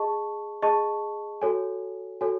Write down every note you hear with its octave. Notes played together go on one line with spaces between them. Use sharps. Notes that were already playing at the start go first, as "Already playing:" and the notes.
Already playing: G#4 D#5 A5 C#6
G#4 D#5 A5 C#6
F#4 A4 C#5 G#5
F#4 A4 C#5 G#5